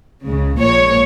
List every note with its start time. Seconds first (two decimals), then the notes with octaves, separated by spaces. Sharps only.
0.25 C#2 C#3 G#3
0.59 A#1 A#2 G#3 C#5